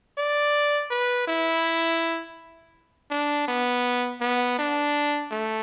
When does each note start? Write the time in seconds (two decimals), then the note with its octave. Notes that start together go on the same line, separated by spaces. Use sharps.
0.18 D5
0.91 B4
1.28 E4
3.11 D4
3.48 B3
4.21 B3
4.59 D4
5.32 A3